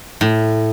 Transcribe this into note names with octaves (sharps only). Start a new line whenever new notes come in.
A2